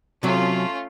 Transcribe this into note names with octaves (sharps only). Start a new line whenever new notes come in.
C3 F#3 A3 C#4 F4